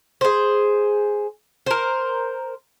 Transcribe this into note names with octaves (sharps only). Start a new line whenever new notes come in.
G#4 C5
A#4 C5